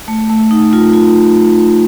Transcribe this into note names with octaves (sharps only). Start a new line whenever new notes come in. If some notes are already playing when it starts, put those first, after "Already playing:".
A3
A3
D#4
F4
F4